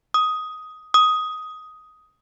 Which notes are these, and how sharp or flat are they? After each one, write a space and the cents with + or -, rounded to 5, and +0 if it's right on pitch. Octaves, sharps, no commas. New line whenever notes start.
D#6 +10
D#6 +10